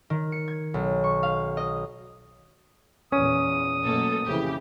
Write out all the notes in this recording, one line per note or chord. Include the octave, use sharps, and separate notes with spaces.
D#3
C#7
G#6
B1
C#6
F5
D#5
E2 A#2 C#4 D#6
F#2 B2 A3 A#3 A4
F2 C#3 E3 G4